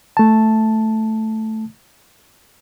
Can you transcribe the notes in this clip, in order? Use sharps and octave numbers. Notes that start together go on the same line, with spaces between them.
A3 A5